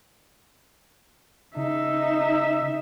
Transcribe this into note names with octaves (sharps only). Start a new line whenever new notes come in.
C#3 D#4 E5